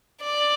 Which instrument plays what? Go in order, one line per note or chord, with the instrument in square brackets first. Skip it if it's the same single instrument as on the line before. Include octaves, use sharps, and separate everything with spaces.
[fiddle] D5